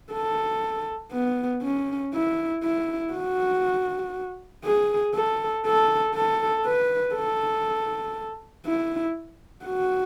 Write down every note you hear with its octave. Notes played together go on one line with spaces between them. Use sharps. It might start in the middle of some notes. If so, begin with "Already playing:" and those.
A4
B3
C#4
E4
E4
F#4
G#4
A4
A4
A4
B4
A4
E4
F#4